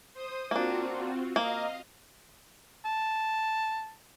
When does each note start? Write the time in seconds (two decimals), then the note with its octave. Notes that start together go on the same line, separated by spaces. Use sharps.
0.14 C5 D#6
0.51 A#3 C4 D4 F4 F#4
1.36 A#3 D#5 F5
2.85 A5